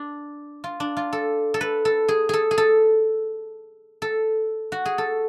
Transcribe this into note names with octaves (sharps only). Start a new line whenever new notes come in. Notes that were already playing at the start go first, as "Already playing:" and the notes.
Already playing: D4
F4
D4
F4
A4
A4
B4
A4
G#4
G#4 A4
G#4
A4
A4
F#4
G#4
A4